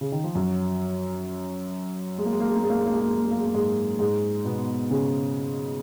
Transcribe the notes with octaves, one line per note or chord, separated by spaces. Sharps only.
C#3
D#3
F3
F#2 F#3
G#3
A#3
G#3
A#3
G#3
A#3
G#3
A#3
G#3
A#3
G#3
A#3
G#3
A#3
G#3
A#3
G#3
A#3
G#2 G#3
G#2 G#3
B2 B3
C#3 C#4